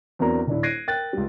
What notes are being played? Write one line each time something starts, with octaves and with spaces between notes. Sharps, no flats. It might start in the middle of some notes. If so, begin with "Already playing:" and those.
E2 F#3 C4 D4 A#4 A#5
D#1 D4 E4
F#6 G#6 A#6 C7 D7 D#7
A#4 G5 F#6 A6
C#2 G3